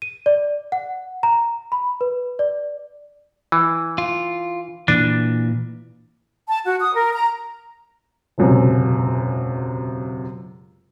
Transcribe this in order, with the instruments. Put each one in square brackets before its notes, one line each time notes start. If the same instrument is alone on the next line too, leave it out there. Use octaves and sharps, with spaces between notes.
[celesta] D#7
D5
F#5
A#5
B5
B4
D5
[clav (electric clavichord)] E3
[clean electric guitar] F4
[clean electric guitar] A#2 E3 [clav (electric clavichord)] D4
[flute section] A5
F#4
D#6
A#4
A#5
[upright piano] E1 C#2 F#2 C3